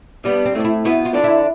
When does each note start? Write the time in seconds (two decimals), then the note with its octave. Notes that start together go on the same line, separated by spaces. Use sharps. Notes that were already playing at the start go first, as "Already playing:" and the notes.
0.25 G2 G3 B3
0.46 C4
0.55 A2 A3 D4
0.65 E4
0.85 B2 B3 E4
1.05 F4
1.14 D3 D4
1.24 E4